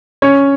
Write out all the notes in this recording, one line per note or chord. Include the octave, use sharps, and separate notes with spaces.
C#4 C#5